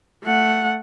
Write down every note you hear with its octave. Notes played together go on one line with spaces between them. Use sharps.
A3 F#5